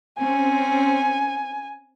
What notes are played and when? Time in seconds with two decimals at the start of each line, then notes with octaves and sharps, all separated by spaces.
0.18 C4 C#4 G#5